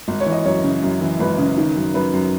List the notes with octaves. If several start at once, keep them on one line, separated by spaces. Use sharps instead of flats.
G#1
C#5
E3
D#5
F#2 C#5
C#3
F#2
E3
G#1 B4
C#3
D#3
F#2
F#2 B4
F#2